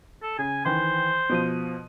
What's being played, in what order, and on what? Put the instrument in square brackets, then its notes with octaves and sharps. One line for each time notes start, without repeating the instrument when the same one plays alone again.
[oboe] A4
[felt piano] C#3 [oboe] G#5
[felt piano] D#3 E3 [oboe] C5
[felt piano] B2 F3 D#7